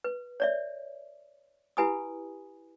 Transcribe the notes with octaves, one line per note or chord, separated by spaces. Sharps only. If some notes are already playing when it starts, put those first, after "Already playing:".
B4
C#5 D5 E5
E4 G4 B4 G#5 B5 D#6